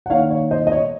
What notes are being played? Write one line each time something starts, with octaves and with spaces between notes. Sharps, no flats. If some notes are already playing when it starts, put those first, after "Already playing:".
F#5
D#3 A#3 C#5 F5
C#5
C5 D#5
D#5
C#5